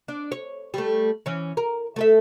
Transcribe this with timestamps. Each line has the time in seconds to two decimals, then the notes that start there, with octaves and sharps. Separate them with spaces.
0.08 D4
0.32 C#5
0.74 G3 A3
1.26 E3 C#4
1.57 A#4
1.96 A3 A4 E5